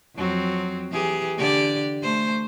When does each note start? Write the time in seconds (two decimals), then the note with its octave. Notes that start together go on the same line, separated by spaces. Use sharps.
0.15 F2 F#3 C4
0.91 E3 G4 G#4
1.37 D3 G4 D5
2.02 A3 C5